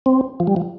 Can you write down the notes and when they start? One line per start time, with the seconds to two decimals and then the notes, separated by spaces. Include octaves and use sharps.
0.06 C4
0.40 F3
0.47 G3
0.56 F3